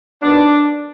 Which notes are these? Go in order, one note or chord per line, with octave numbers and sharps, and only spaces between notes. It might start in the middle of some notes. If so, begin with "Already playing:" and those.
D#3 F#3 B3 D4